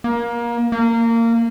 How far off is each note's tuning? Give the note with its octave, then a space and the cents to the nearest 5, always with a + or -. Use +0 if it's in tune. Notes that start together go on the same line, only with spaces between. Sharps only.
A#3 +25
A#3 -20